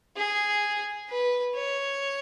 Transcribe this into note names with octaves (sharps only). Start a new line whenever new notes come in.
G#4
B4
C#5